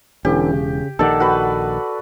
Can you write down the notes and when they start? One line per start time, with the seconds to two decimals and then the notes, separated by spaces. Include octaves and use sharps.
0.25 E1 D3 E3 C#4 G4
0.53 C#3
0.99 A#1 D#3 G4 A4 D5 F#5
1.20 F#4 B4